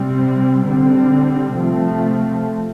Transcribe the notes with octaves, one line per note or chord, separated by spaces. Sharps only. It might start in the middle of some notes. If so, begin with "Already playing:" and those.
Already playing: C3 G3 C4
D3 G3 C4
C3 F3 A3 C4